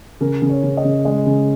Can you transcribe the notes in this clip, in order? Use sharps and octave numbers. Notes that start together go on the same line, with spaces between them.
C#3 A#4
C#3
C#5
C#3
D#5
C#3
G#3 D#5
C#3